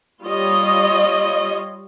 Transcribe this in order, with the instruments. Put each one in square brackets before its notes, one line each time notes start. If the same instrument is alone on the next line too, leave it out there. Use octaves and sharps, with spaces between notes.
[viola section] G3 F4 C#5 D#5